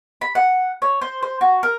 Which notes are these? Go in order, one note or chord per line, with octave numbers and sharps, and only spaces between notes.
B5
F#5
C#5
C5
C5
F#4
A#4